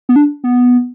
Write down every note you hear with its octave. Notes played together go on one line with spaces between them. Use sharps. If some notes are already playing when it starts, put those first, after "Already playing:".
B3
D4
B3